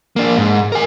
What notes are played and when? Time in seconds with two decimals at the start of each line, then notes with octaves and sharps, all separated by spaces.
0.16 A#3 D4
0.38 G#2
0.72 A#4 G#5